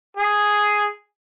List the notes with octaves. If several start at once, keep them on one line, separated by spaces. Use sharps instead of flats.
G#4